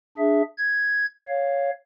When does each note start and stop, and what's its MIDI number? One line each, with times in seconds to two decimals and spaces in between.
0.18 0.42 62
0.18 0.42 68
0.18 0.42 76
0.58 1.06 92
1.28 1.70 73
1.28 1.70 77